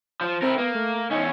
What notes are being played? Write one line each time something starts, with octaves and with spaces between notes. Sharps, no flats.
F3
C4 E4 A#4
A#3 B3
A3
E2 C#4 D#4